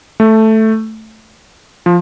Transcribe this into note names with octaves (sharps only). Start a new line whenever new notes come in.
A3
F3